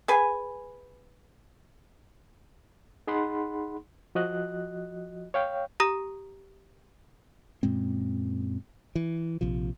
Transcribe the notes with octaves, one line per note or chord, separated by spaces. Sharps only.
G#4 B4 G#5
D#4 G#4 F#5 B5 C6
F3 F#4 D#5 F#6
C#5 F5 G5
G4 A#5 D#6 A#6
F#2 A#2 G#3 C4
E3
A#1 C3 F3